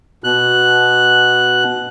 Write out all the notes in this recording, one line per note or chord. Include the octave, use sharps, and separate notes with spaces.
B2 F#6